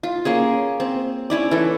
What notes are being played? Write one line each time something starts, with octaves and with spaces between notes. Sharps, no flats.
F4
A#3 C#4 G#4
C4
C#4 E4 D5
E3 A4